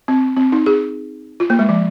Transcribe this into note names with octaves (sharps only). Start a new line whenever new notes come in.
C4
C4
D#4
G#4
F4
A#3
G#3
F3